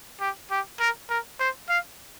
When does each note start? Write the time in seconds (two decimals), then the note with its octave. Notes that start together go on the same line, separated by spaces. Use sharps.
0.20 G4
0.51 G4
0.80 A#4
1.10 A#4
1.40 C5
1.69 F5